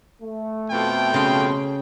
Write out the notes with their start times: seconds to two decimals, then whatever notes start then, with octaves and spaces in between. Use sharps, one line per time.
0.22 A3
0.70 F2 B2 G5
1.14 C#3 C6